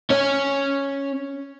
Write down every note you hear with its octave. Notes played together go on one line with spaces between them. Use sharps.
C#4 C#5